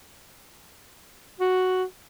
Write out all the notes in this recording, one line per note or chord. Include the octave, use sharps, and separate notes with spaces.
F#4